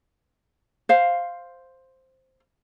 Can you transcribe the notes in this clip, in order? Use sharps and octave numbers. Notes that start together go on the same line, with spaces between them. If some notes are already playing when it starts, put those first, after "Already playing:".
C5 F5